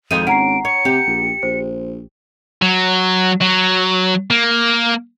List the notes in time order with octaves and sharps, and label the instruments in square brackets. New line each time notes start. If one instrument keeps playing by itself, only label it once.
[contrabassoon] G#1 [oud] F2 F3 D#4 [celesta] D#7
[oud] C#4 [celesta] F#5 A#5 C7 [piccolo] D7
[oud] C#5 [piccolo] C#7
[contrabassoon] C3 [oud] G4
[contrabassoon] A#1
[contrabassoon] A#1 [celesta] C5
[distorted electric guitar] F#3
F#3
A#3